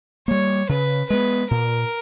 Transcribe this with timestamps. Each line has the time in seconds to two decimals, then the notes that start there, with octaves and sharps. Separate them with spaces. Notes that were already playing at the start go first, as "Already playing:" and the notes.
0.28 G3 A#3 C#5
0.69 C#3 B4
1.10 G#3 B3 B4
1.51 A#2 A#4